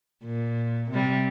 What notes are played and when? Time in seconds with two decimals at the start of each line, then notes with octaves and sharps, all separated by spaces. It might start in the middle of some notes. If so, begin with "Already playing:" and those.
0.25 A#2
0.91 C3 G3